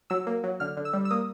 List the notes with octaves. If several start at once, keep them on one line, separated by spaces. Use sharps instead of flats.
F#3 E6
A#3
F#3
D3 F6
D3
E6
G3
E6
A#3 D#6